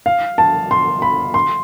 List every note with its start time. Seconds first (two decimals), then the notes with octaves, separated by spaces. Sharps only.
0.06 F5
0.38 A5
0.71 C6
1.02 B5
1.34 C6